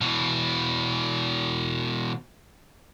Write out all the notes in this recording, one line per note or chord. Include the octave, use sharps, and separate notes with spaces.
B2 E3